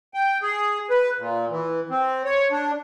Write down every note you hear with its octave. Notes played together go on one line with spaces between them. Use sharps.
G5
G#4
B4
A#2
E3
C4
C#5
D4